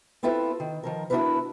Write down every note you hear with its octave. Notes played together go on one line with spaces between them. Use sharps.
B3 C4 E4 F4 A4 B4
D#3
D#3 F3 A#4
B3 D4 E4 F#4 A#4 B4